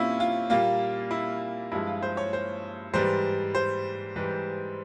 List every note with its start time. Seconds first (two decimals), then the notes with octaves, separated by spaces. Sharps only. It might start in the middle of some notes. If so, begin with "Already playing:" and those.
Already playing: A#2 G3 A#3 C4 C#4 E4 F4
0.20 F4
0.50 A#2 G3 A#3 F4
1.11 E4
1.72 G2 F3 G#3 E4
1.87 F4
2.02 C5
2.17 C#5
2.33 C5
2.93 G#2 E3 G3 C5
3.55 C5
4.16 G#2 E3 G3